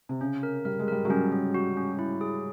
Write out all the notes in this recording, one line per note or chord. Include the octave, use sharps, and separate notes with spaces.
C3
C#3 C#4
A#4
G3 A#4
G#3
G3 A#4
F#3
G3 C#4
C#4
F#4
C#4
E4
G#4